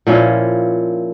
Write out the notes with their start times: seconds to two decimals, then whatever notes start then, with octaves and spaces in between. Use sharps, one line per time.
0.07 A#2 F3 C#4 E4